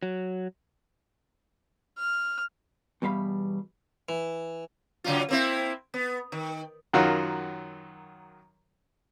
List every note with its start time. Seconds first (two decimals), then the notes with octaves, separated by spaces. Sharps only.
0.03 F#3
1.98 F6
3.02 E2 B2 G3 F5 B5
4.09 E3
5.04 C#3 F#3 F4
5.29 A#3 C4 E4
5.94 B3
6.32 D#3
6.94 F#2 D#3 F#3 F4 F#4